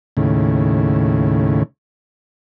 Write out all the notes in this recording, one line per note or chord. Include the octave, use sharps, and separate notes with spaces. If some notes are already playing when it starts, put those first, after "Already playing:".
D#2 A2 C#3